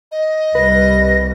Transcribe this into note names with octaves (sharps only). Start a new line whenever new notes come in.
D#5
C2 G3 B4 A#6